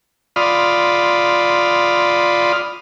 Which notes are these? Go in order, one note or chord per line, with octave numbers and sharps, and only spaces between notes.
F4 D5 B5 C6 D#6 F6